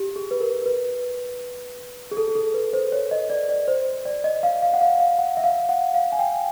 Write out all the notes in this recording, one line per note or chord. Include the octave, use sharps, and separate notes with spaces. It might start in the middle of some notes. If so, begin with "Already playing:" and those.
Already playing: G4
G#4
B4
A#4
B4
G#4
A4
G#4
A4
B4
C5
C#5
D#5
D5
D5
C5
D5
D#5
F5
F5
F#5
F5
F5
F#5
E5
F5
F#5
F5
G#5
G5